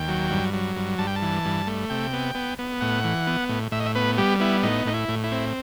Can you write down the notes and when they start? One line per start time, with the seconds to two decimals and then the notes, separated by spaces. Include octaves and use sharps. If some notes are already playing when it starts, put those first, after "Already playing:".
Already playing: D#2 G5
0.08 F#3
0.31 G2
0.54 F#3
0.76 G2
0.98 G2 A5
1.07 G5
1.16 A5
1.22 E3
1.45 G2
1.67 A3
1.90 C3 G5
2.13 B3
2.35 B3
2.58 B3
2.81 A2 F#5
3.04 E3
3.27 B3
3.49 A2
3.72 A2 E5
3.80 D#5
3.86 E5
3.95 B3 B4
4.18 G3 G4
4.40 B3 E4
4.63 A2 D#4
4.85 A2 D#4
4.94 E4
5.08 A2
5.24 E4
5.32 C4